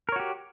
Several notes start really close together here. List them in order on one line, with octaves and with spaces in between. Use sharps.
A#4 C#5 F#4 G4